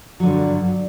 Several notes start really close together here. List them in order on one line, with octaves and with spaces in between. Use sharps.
F#3 D3 G2